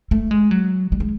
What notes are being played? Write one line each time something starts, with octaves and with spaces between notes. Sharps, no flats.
A3
G#3
F#3
G3
G#3